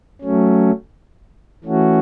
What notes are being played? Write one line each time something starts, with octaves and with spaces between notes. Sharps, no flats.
F#3 A3 C#4
E3 A3 C#4 F#4